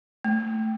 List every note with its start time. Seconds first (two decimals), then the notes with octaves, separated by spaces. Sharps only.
0.24 A3